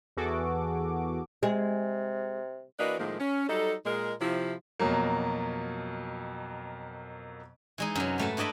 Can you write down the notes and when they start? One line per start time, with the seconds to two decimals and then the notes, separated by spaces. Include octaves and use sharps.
0.17 E2 E3 F#4 G#4 A4 D6
1.43 C3 G#3
2.79 E3 A#3 D4 F#4 B4 D#5
2.99 A2 D#3 F3 G#3 A#3
3.19 C#4
3.49 F#3 G3 D#4 A4
3.85 A#2 G#3 A#4
4.21 C3 F3 E4
4.80 F2 B2 F#3 A#3
7.78 E3 G#3 D#4
7.95 F#2 C3 F#3
8.18 G#2 A3 B4 A5
8.37 G2 E4 D5 D#5 A5 B5